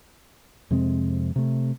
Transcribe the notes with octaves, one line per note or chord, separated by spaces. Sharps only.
F2 C3 G#3 C4
C3 A3